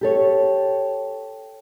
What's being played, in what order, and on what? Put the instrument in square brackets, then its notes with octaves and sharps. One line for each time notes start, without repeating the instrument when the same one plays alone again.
[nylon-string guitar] G4 A4 C#5